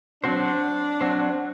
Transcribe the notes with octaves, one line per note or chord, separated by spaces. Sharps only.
F#3 C4 D4 F#4 C5
F#3 C4 F#4 C5